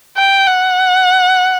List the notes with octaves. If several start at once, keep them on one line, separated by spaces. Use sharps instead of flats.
G5
F#5